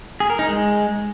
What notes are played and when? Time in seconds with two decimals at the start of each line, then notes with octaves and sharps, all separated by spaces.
0.20 G#4
0.30 A#4
0.39 D#4
0.48 G#3